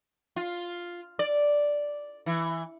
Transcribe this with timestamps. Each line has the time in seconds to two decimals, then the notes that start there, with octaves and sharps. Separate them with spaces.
0.36 F4
1.19 D5
2.26 E3